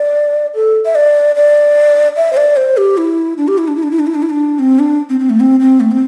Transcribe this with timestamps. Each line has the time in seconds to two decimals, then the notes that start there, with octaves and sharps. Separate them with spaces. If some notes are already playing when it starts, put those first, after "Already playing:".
Already playing: D5
0.55 A4
0.85 E5
0.95 D5
1.36 D5
2.16 E5
2.33 C5
2.37 D5
2.57 C5
2.77 G4
2.97 E4
3.37 D4
3.48 G4
3.58 E4
3.68 D4
3.76 E4
3.83 D4
3.91 E4
3.99 D4
4.07 E4
4.15 D4
4.23 E4
4.30 D4
4.59 C4
4.79 D4
5.09 C4
5.19 C4
5.30 A3
5.40 C4
5.60 C4
5.80 A3
5.91 C4